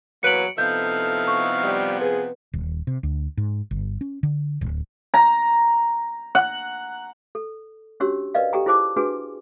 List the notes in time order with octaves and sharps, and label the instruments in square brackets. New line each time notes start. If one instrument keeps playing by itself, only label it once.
[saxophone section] E2 A#3 B4 [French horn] F#3 [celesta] C#7 D7 F#7
[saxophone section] C3 F3 B3 [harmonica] D#4 E4 F5 [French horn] A4 [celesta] G6
[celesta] C#6
[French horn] G3
[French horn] G#4 [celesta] B4
[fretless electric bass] D#1
C3
D2
G#2
G1
C#4
D3
D1
[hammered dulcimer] A#5
F#5
[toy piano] A4
C#4 D4 F#4 G4 C#5 E6
A#4 B4 D5 D#5 F5
G4 A4 G5 A#5
E4 F4 G#4 C5 A5 D6
D4 F#4 G#4 B4 G#5